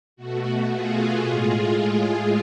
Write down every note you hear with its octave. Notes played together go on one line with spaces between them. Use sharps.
B2 A3 F#4
F4 G#4
A2 G#3
F4 G#4